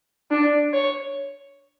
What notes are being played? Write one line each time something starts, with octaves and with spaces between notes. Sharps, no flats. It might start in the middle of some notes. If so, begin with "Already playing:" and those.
D4
C#5